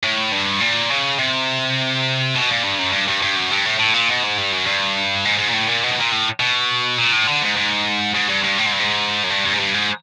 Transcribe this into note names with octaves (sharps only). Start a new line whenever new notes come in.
A2
G2
A#2
C#3
C3
B2
A#2
G2
F#2
G2
G2
G2
F#2
G2
A2
A2
A#2
B2
G#2
G2
F#2
G2
G#2
G#2
A#2
A2
A#2
B2
A2
A#2
A2
B2
A#2
A2
D3
G#2
G#2
G#2
G2
G2
A2
G#2
G2
G#2
F#2
G2
G2
G#2
G2
G#2